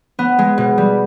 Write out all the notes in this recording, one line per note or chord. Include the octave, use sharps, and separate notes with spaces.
B3
G#3
B2
G3